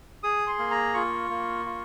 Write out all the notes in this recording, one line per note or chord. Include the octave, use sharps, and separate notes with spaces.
G#4 D#6
C6
A#3
A#5
F4 C#6
A#3
F4